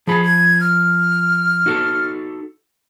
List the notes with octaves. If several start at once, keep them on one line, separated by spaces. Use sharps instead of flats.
F3 F4 G#4 B5
G#6
F6
D#4 F#4 A4